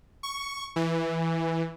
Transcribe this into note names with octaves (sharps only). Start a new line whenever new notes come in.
C#6
E3